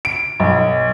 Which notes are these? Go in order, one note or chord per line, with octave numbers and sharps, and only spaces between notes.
D7
B1